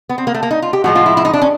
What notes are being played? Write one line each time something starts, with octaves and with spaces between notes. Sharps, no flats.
B3
C4
A#3
A3
A#3
D#4
F4
G4
A2 F3 G#3 F#4
F4
E4
E4
D#4
D4
C#4